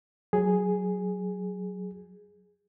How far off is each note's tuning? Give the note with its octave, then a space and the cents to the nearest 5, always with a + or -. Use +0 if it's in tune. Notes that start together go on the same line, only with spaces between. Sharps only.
F#3 +0 G#4 +0